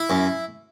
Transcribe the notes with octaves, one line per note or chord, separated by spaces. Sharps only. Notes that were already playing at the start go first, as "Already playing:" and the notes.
Already playing: E4
F#2